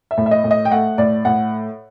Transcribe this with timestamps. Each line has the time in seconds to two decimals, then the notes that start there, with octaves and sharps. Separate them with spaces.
0.11 E5
0.18 A2
0.26 E5
0.31 D#5
0.44 A2
0.51 D#5
0.65 G5
0.71 A3 F#5
0.98 A2 D5
1.25 A2 F#5